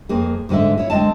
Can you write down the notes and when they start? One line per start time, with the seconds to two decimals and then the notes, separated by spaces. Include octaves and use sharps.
0.09 F2 A#3 G#4
0.49 G#2 D3 G#3 A4 E5
0.78 E4 C#5
0.90 D3 G#3 C4 D#5 A5